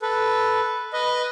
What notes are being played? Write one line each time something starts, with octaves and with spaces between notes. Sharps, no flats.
A4 B4
B4 D#5